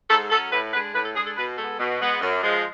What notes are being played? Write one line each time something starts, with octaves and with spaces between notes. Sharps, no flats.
G#2 A4
F#3 C#4 A4
A2 B4
G#3 D4 B4
A2 B4
A4
G#3 D4 G#4
A4
B2 B4
G#3 B3 A4
B2
G#3 B3
F#2
F3 G#3